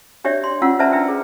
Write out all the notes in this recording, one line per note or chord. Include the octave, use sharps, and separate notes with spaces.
D4 G4 C#5 D5 E5
C6
C#4 F4 F#5 E6
B4 C5 D5 E5 A5 A#5
D4 B4 E5 G5
G#4